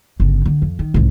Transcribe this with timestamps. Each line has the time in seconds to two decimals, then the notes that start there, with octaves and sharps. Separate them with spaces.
0.20 G1 C#3
0.45 D3
0.62 F2
0.79 D#3
0.94 C2 G#2